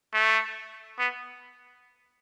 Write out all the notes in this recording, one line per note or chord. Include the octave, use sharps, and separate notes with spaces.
A3
B3